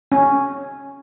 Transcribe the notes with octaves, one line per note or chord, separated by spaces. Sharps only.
C#4